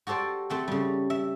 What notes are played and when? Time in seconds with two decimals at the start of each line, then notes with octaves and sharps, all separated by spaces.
0.07 F#4 G4 A4 C5 D5
0.50 A3 C4 F#5
0.68 C#3 G3
1.10 E5